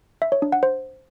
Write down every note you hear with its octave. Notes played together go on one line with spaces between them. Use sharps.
E5
C#5
D4
F#5
C5